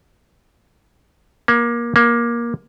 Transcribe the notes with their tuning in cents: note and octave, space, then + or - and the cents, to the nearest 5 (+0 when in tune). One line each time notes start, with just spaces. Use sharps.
A#3 +25
A#3 +20